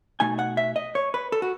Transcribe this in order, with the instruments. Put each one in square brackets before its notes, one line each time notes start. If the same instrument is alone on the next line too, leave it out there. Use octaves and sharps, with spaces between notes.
[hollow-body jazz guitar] B2 A3 D#4 G#5
F#5
E5
D#5
C#5
B4
A4
F#4